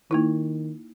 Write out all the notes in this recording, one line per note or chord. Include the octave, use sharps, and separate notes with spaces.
D#3 A#3 D#4 E4